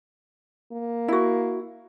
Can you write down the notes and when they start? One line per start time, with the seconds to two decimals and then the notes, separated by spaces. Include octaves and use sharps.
0.72 A#3
1.08 E4 F#4